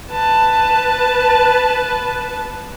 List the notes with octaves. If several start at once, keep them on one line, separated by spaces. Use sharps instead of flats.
B4 A5